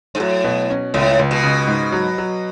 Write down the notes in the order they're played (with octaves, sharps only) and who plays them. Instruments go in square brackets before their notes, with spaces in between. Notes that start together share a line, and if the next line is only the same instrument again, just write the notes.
[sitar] G#2
[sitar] A2 [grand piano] F#3
[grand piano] B2
C#4
[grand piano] C#2 [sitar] A2
[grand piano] C#2
[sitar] B2
[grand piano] C#3
G#2
F#3
F#3